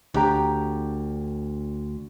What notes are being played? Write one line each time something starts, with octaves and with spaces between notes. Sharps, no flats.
D2 D4 G4 A#5